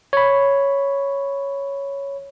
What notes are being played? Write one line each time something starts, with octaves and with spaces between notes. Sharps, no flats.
C#5 B5